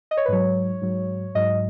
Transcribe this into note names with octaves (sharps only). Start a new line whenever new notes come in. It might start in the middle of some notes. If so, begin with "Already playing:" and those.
D#5
C#5
B4
G#2 F#3 C#5
G#2 F#3
G#2 F#3 D#5